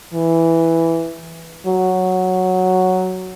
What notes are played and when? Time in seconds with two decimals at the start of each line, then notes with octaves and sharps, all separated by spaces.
0.14 E3
1.66 F#3